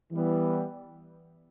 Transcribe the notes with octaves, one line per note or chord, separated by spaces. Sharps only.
E3 G3 B3